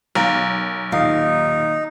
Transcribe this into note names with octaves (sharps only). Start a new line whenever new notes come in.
B1 A#4 F5 A#5
D#2 A#2 D#4 F5